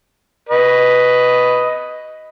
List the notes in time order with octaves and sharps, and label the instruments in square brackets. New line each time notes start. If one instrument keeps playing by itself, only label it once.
[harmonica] B4 D#5